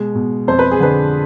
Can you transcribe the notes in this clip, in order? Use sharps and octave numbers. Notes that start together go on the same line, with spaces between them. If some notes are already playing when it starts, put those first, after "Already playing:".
Already playing: B2 G#3
B2
F2 C5
B4
G#4
D3 B4